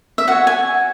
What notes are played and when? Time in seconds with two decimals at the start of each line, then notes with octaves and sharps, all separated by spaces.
0.18 E5
0.27 F#4 C#5 F#5
0.47 G#5